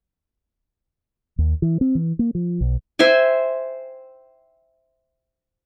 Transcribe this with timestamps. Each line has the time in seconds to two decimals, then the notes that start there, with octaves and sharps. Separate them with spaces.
1.38 D#2
1.62 E3
1.81 C4
1.95 E3
2.19 A#3
2.35 F3
2.61 B1
2.99 C5 E5 G5 G#5